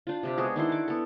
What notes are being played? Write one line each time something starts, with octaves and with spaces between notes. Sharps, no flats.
D4 F4
C3 D4 G4
G#3 B3 F#4 G#4
D#3 D4 E4 C6
F#5 D6
B3 A4